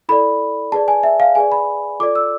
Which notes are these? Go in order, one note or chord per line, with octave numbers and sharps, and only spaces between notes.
E4 A4 D5 B5
G#4 B4 D5 A5
G#5
E5
F5
G#4 B4 D5 G#5
B5
F4 A4 D5 D6
E6